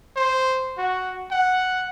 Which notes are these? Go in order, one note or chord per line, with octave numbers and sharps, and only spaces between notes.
C5
F#4
F#5